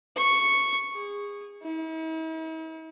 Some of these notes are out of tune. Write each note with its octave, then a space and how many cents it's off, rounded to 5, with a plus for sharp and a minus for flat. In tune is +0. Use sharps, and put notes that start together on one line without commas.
C#6 +0
G#4 -25
E4 -45